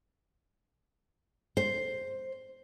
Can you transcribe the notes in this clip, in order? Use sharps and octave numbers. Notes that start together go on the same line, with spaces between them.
C5